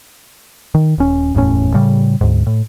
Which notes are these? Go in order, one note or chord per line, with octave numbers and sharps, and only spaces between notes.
D#3
D#1 C#4
F#1 E2 A2 C#4
A2 C#3 G3
D2 G#2
A2